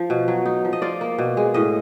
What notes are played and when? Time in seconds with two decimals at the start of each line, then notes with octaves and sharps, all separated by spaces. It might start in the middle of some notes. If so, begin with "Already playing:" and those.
Already playing: F3
0.10 B2
0.28 F#3
0.46 D#4
0.65 F3
0.73 D#5
0.82 F4 D5
1.01 A#3
1.19 B2
1.37 G#3
1.54 A2 D#5